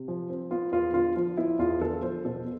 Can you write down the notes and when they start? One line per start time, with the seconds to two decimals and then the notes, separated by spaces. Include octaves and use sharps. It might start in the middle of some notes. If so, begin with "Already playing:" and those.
Already playing: C3
0.08 F3
0.30 C4
0.51 B3 F4
0.72 E2 F4
0.94 D3 F4
1.16 F3 F4
1.37 B3 E4
1.59 E2 F4
1.81 D3 A4
2.02 F3 C5
2.25 B2 A4